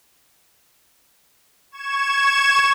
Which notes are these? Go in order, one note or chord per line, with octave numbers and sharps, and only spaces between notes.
C#6 G#6 E7